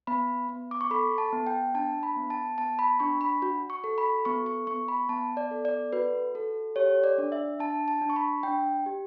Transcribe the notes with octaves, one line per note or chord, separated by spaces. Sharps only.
B3 B5
B3
D6
C#6
A4 B5
A5
B3
G5
D4 A5
B5
B3
A5
B3 A5
B5
D4 C#6
B5
F#4
C#6
A4
B5
B3 C#6
C#6
B3 C#6
B5
B3 A5
D5
A4
D5
F#4 B4
A4
G4 C#5
D5
D4
E5
D4 A5
A5
D4
C#6
B5
D4 G5
G4